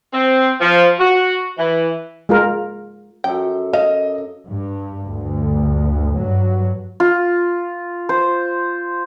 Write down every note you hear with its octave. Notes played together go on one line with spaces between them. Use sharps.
C4
F3
F#4
E3
G#3 F4 A#4
F#2 A4 G5
D#5 F5
G2
D2 G2
G2 F#3
F4
C5